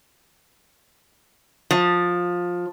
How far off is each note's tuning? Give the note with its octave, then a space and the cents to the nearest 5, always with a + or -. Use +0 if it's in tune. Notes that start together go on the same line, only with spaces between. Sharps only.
F3 +15